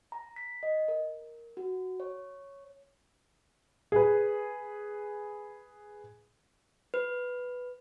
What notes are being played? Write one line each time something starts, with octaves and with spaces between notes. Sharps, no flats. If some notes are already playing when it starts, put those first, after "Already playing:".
A#5
B6
D#5
A#4
F#4
C#5
G#4 B4
B4